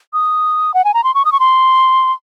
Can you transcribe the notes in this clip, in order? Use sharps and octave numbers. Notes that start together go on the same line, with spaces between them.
D#6
F#5
G#5
A#5
C6
C#6
D#6
C#6
C6